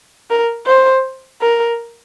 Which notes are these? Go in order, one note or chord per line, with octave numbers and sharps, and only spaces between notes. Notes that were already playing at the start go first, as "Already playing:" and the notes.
A#4
C5
A#4